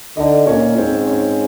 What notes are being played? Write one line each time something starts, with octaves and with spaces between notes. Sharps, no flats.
D3 D#4 D#5
A#2 C#4 C#5
G#2 C4 C5
C#4 C#5